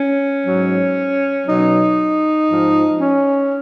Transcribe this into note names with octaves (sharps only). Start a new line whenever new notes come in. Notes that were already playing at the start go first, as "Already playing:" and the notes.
Already playing: C#4
G#2 F#3
B2 F#3 D#4
G#2 F3
C#4